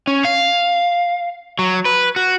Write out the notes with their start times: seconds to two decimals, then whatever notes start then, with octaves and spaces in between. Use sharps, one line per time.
0.07 C#4
0.25 F5
1.59 F#3
1.85 B4
2.16 F#4